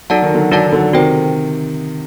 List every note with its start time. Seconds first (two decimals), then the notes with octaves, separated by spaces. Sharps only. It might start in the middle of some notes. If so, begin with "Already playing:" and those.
0.10 F#3 D#4 A4 D5 F#5 A5
0.22 D#3
0.34 D3 F#3
0.51 D3 F#3 D#4 A4 D5 F#5 A5
0.72 D3 F#3
0.93 C3 D#3 F#4 A4 C5 G5